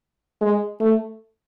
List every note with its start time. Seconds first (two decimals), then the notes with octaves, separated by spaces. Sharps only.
0.41 G#3
0.80 A3